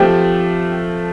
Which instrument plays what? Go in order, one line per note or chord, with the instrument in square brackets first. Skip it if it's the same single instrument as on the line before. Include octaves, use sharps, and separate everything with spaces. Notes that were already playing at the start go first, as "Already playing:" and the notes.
Already playing: [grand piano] F3 A3 C4 [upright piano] G4